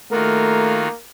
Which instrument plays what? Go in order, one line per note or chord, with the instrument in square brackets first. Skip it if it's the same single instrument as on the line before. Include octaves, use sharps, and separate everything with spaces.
[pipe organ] D#3 F4 F#4 [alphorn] A3 [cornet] A#3 [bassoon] A#4